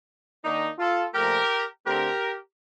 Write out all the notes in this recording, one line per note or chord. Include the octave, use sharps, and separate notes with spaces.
D#3 A#3 D4 D#4
F4 A4
A#2 F3 A3 G4 A#4
D3 A3 C4 G4 A#4